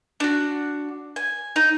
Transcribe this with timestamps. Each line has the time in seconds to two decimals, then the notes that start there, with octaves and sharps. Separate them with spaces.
0.20 D4 F#4
1.16 G#5
1.56 D#4